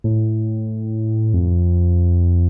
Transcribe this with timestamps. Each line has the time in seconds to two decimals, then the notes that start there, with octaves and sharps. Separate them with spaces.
0.04 A2
1.34 F2